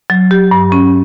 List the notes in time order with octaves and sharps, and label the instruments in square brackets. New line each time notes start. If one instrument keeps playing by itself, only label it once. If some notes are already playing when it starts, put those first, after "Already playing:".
[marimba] F#3
G4
G2
C#4